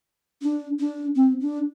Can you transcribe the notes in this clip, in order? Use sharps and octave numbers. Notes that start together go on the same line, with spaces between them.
D4
D4
C4
D4